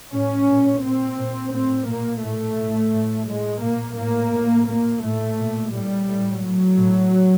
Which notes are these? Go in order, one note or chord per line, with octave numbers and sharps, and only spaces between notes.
A2 C#4
A#2
A#2 C4
A#2
A2 C4
A#2 A#3
A2 A3
A2
A2
A2 G#3
A#2 A#3
A2 A#3
A2
A#2 A#3
A2 A3
A#2
A2 G3
A2
A2 F#3
A2